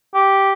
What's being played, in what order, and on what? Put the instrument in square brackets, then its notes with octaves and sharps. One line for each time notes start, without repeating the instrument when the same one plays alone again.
[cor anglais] G4